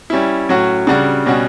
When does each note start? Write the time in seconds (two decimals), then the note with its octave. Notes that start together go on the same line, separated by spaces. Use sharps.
0.10 G3 C#4 E4
0.49 A2 F#3 C#4 F#4
0.87 C#3 G3 D4 F#4
1.26 B2 G3 C#4 F#4